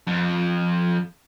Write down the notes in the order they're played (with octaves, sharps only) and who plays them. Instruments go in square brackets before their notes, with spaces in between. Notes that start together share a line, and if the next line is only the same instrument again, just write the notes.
[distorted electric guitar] F2